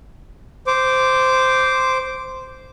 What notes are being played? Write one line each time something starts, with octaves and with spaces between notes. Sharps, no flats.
C5 D6